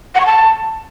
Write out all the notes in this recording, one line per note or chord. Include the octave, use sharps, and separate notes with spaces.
F#5
C#6
A5